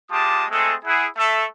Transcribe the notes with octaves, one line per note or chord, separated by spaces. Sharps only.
G#3 F4 G4 A5 D6 D#6
G#3 A3 C4 G#4 A4
E4 G#4 F#5
A3 A4 E5